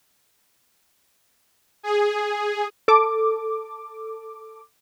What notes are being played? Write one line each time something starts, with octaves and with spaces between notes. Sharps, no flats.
G#4
A4 D6